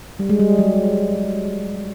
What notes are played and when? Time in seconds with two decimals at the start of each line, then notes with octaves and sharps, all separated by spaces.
0.19 G3
0.29 G#3
0.39 G3
0.59 F#3